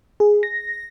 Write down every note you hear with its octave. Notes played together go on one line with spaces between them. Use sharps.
G#4
A#6